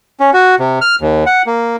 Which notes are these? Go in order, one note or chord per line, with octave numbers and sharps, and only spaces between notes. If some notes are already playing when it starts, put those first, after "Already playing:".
C#4
F#4
C3
F6
D#2
F#5
A#3